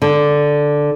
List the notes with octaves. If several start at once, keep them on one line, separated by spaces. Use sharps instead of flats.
D3